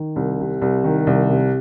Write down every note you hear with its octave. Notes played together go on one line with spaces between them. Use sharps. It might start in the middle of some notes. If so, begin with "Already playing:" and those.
Already playing: D#3
C2
C3
C2
D#3
C2
C3